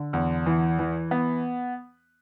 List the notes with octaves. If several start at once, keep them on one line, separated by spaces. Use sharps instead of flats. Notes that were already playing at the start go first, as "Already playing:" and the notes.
Already playing: D3
E2
E3
E3
B3